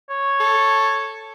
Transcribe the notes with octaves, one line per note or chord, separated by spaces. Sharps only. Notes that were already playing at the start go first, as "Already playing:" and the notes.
C#5
A4